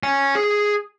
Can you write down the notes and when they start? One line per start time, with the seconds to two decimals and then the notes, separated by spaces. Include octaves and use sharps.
0.03 C#5 G#5
0.35 G#4